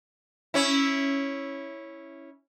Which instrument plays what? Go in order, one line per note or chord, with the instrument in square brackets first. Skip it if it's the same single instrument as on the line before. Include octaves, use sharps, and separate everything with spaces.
[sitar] C#4 E4